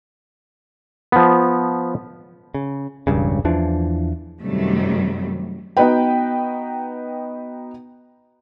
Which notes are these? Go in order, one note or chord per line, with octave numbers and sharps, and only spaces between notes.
F3 B3
C#3
E1 C#2 G2 C#3
E2 E3 F3 D4
F#2 C3 D#3 F#3 G3 A3
B3 D#4 F#4 B4 G5